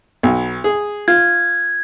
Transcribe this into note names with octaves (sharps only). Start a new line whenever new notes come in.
B1
G#4
F4 G#6